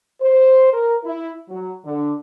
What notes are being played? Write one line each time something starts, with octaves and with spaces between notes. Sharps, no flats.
C5
A#4
E4
F#3
D3